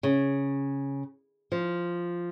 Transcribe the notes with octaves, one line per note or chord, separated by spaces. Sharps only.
C#3
F3